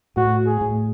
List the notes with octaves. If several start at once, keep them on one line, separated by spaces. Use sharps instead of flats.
A2 F#4
G#4
A2